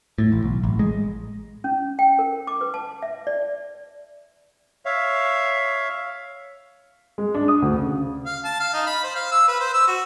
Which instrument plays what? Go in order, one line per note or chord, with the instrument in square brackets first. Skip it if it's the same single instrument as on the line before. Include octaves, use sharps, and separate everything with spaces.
[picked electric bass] A2
A1
B1
A1
G#3
[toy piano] C#4
G5
A#4
D6
B4
A5
E5
D5
[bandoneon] C#5 E5 F5
[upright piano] G#3
D4
D#6
D2
C#3
[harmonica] F5
A5
F5
D#4
B5
C5
F5
E6
B4
C5
E6
F#4